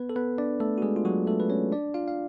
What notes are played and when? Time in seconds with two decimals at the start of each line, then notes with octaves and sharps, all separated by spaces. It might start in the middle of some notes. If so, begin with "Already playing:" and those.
Already playing: B3 B4
0.10 A4
0.16 B3 B4
0.38 D4 D5
0.60 A3 A4
0.78 F#4
0.82 G#3 G#4
0.96 F4
1.05 F#3 F#4
1.27 A3 A4
1.40 B4
1.50 C#4 C#5
1.72 D4 D5
1.94 F4 F5
2.08 F5